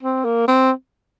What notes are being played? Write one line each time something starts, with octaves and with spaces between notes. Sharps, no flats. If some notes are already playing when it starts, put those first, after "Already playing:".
C4
A#3
C4